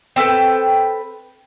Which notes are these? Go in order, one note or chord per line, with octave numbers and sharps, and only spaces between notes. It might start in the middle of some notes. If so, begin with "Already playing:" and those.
C4 A4 B4 G5